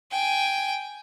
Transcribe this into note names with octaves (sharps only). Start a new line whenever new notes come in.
G5 G#5